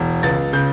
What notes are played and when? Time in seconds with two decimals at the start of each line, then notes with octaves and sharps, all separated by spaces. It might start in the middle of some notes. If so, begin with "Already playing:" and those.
Already playing: E1
0.23 C#2 A6
0.53 C#3 G6